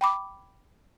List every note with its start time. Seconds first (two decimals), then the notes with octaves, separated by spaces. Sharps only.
0.01 G5 B5 D6